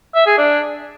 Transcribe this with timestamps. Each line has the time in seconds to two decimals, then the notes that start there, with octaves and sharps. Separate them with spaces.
0.15 E5
0.26 G#4
0.38 D4